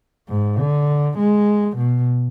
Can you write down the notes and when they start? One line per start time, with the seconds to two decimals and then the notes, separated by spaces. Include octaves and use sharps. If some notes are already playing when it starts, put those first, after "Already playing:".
0.29 G#2
0.59 D3
1.18 G#3
1.77 B2